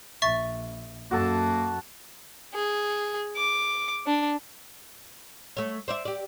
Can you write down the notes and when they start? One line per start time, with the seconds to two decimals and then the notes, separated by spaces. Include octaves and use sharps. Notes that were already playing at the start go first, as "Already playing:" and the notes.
0.22 A#1 E5 C#6 A6
1.11 F#2 A#3 F#4 A4 A5
2.54 G#4
3.36 D6
4.07 D4
5.57 A3 C#5
5.88 C5 D5 E5
6.05 G4 D5